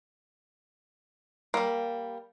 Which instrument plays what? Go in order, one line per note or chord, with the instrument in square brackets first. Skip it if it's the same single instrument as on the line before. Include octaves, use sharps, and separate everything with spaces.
[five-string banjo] G3 A#3